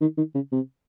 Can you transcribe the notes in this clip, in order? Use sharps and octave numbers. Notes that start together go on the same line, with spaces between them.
D#3
D#3
C#3
C3